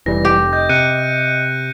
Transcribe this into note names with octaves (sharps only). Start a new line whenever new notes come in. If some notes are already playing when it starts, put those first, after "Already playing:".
F1 E3 G3 A#6
G4
D#5 G6
C3 F#6 C#7 D#7